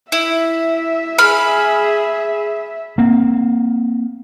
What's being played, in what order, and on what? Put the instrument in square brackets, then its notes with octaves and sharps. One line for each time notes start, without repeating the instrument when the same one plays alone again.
[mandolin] E4 [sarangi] E5
[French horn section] G#4 [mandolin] B5 F6
[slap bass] A#3 C4